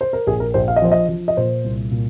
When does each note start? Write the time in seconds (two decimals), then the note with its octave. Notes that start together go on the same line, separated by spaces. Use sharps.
0.01 C5
0.13 A#4
0.26 A#1 G#4
0.40 A#4
0.54 A#1 C5
0.68 F5
0.76 D#5
0.82 F3 C5
0.92 D#5
1.09 F3
1.28 D#5
1.37 A#2 C5
1.64 C2
1.91 A#2